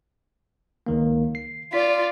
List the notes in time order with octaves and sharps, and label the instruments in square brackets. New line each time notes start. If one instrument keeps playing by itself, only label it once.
[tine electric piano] C#2 D#3 A#3
C7
[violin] F4 D5 [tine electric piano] B6